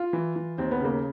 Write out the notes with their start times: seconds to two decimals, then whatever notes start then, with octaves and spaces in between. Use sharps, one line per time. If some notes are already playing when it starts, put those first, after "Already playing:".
Already playing: F4
0.13 E3
0.36 E3
0.58 D#2 C4
0.71 B3
0.81 C#3 A#3